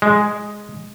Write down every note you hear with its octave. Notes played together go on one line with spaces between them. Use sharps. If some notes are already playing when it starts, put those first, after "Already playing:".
G#3